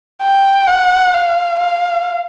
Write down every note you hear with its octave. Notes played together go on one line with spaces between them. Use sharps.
G5
F#5
F5
F5